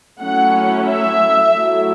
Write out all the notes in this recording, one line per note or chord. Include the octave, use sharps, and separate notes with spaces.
F#3 A3 C#4 E4 F#5
E5
F#3 A3 E4